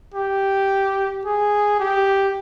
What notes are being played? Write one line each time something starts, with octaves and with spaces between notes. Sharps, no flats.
G4
G#4
G4